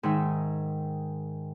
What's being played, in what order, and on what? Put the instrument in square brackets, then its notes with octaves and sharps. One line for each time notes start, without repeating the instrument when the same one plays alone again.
[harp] G#2 D#3 E5